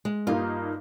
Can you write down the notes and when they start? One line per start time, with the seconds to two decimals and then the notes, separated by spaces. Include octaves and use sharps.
0.05 G#3
0.27 G2 A#3 D#4 F4